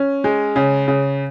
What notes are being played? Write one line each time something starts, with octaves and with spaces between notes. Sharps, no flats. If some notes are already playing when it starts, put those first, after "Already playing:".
Already playing: C#4
G#3
C#3
C#3